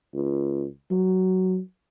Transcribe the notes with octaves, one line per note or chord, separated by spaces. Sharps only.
C#2
F#3